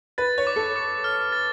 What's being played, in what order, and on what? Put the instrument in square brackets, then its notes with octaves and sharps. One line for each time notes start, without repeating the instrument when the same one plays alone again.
[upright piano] B4 [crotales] A6
[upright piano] C#5
[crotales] D6
[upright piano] A4
[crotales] D6
F6
A6